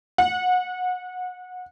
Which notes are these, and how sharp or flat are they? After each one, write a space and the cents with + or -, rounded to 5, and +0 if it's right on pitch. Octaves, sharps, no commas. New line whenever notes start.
F#5 -25